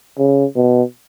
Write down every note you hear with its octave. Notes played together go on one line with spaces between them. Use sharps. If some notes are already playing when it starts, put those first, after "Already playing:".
C#3
B2